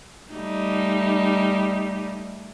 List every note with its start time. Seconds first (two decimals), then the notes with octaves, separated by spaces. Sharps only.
0.32 G3 A3 D#4